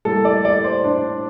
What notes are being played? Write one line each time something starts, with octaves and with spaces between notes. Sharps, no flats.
A2 G3 A#3 A4
D5
D5
C5
D4